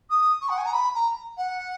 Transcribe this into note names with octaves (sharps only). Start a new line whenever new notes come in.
D#6
C#6
F#5
G#5
A#5
B5
A#5
F#5